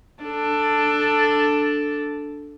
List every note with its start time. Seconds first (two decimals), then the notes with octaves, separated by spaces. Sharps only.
0.23 D4 A4